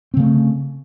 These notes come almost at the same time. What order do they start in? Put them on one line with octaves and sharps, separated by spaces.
C4 C#3 A3